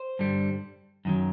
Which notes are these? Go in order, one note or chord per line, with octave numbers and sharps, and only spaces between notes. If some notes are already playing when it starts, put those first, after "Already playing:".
Already playing: C5
G2 D3 G3
F#2 D#3 F#3